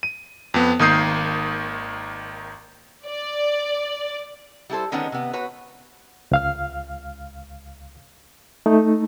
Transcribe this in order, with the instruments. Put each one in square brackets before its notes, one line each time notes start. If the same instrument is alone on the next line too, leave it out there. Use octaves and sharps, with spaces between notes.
[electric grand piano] D#7
F2 B3
G#1 D#3 A#3 D#6 G6 C7
[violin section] D5
[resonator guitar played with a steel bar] G3 E4 A4 C5
D3 D#3 G#3 B3 C#4 D4
C3 B3
F#4 B4 C#5
[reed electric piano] C#2 F5 F6
A3 D#4